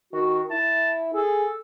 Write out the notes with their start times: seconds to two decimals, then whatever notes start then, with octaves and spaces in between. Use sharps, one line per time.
0.13 D#3 F#4
0.51 E4 A5
1.14 G#4 A4